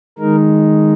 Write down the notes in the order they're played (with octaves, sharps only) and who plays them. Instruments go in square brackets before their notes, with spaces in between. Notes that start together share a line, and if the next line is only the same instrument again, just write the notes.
[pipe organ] D#3 G#3 D#4 A#4